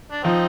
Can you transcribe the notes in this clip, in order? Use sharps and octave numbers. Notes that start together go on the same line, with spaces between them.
D4
F3 C4 D#4